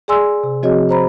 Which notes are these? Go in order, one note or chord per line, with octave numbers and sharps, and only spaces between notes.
G#4 D5 G#5 C6 E6
C3
F3 C4 F#4 G#4 C#5 D#5
C5 A#5 B5